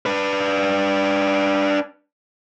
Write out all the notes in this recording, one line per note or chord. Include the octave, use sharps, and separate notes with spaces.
D4 B4